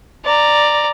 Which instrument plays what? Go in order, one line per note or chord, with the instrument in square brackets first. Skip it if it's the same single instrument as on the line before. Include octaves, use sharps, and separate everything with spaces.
[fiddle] D5 A#5